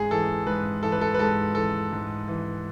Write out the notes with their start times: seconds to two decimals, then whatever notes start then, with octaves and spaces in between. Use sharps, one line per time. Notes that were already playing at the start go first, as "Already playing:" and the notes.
Already playing: G#2 G#4
0.11 E3 A4
0.47 G#2 B4
0.83 E3 A4
0.92 B4
1.01 A4
1.14 B4
1.19 G#2 A4
1.55 E3 A4
1.92 G#2
2.28 E3